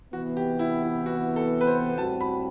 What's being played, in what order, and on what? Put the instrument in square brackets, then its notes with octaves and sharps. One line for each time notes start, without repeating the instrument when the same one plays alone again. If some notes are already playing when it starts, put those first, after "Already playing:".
[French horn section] C3 E3 B3 [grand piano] F#4
[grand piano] G4
E4
E4
F#4
A4
B4
C5
[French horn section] A2 G3 C4 F#4 [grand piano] A5
[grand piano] B5